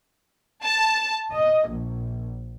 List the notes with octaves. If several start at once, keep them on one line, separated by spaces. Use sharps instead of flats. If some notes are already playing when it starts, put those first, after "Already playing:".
A5
D#5
A#1